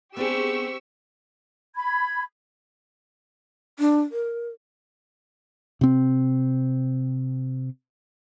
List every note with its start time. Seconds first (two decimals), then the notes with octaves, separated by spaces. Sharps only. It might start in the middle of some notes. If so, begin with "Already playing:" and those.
0.17 B3 C4 D4 G4 G#4 C#6 E6
1.75 B5 G#6
3.79 D4
4.12 A#4
5.81 C3 C4